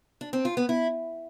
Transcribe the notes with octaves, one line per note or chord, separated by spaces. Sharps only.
D4
C4
F4
B3
E4